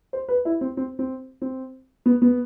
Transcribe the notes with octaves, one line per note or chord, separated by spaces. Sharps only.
C5
B4
E4
C4
C4
C4
C4
B3
B3